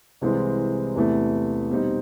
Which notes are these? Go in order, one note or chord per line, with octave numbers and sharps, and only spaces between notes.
C2 C3 E3 G#3 C4
E2 C3 E3 A3
B2 G3 C4 D#4